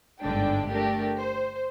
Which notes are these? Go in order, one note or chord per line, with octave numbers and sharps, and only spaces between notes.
G1 G#2 D3 D4 G5
A3 D4 G4 A#4
C5